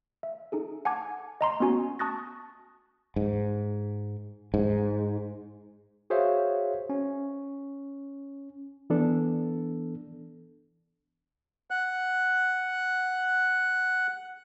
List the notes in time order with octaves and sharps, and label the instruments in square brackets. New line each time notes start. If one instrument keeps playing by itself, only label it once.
[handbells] E5
D#4 G#4 A4
F#5 G#5 A5 D6 G#6
D#5 A#5 C6
B3 C#4 F#4 G#5
A5 C#6 D#6 F#6 A6 A#6
[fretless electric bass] G#2
G#2
[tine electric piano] F#4 G#4 C5 C#5 E5 F5
C#4
[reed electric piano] E3 B3 D4 A4
[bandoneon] F#5 F#6